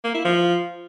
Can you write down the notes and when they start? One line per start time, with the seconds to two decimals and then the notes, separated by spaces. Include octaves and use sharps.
0.04 A#3
0.14 E4
0.25 F3